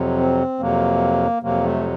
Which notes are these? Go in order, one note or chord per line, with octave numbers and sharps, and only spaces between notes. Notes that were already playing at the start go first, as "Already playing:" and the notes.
Already playing: F2 C3 F#3
C4
F2 C3 F#3 A#3
F2 C3 F#3 A#3
A3